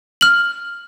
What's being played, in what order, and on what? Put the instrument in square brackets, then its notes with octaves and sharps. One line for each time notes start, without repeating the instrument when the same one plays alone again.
[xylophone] F6 F#7